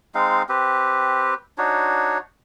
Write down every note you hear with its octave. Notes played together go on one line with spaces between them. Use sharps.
G#3 C4 D#4 F5
C4 G4 B4
D4 D#4 F#4 C#5